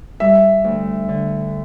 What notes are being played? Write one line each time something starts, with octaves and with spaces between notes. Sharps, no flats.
G3 E5
D2
D3